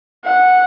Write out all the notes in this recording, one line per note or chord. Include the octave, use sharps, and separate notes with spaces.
F#5